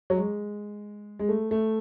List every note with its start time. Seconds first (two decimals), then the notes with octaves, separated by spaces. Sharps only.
0.10 F#3
0.17 G#3
1.19 G#3
1.29 A3
1.51 A3